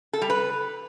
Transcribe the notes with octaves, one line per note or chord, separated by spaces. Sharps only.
A4
G3
B4